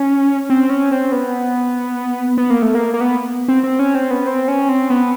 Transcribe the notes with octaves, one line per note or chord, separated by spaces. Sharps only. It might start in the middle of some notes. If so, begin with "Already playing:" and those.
Already playing: C#4
C4
C#4
C4
B3
B3
A#3
A3
A#3
A#3
B3
C4
C4
C#4
C4
B3
C4
C#4
C4
B3